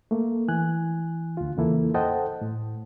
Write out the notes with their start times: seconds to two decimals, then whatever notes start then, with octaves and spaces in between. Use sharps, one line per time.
0.11 A3 A#3
0.48 E3 G#5 F#6
1.37 D2 F4
1.57 E2 C#3 E3 A#3 E4 A4
1.94 A4 C5 D#5 F#5 G5 A5
2.41 A2